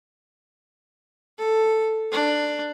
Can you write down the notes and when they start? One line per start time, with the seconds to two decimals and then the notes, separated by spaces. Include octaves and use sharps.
1.39 A4
2.12 D4